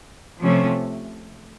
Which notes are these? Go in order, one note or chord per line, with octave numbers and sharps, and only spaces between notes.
C3 F3 A3 C#4